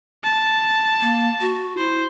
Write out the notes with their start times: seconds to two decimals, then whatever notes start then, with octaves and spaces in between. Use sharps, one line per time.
0.24 A5
1.01 A#3
1.41 F#4
1.78 E4 C5